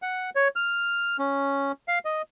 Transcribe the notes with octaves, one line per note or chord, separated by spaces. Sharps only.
F#5
C#5
F6
C#4
F5
D#5